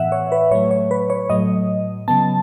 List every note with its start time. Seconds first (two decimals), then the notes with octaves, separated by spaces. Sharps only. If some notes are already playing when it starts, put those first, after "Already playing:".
Already playing: A2 E3 B3 E5 F#5
0.12 C#5
0.32 B4
0.51 A2 F#3 A3 C#5
0.71 C#5
0.91 B4
1.10 C#5
1.30 A2 F#3 A3 D#5
2.08 C#3 F#3 B3 A5